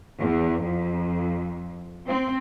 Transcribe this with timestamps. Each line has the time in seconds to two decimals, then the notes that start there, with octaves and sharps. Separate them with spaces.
0.20 E2
0.64 F2
2.07 C4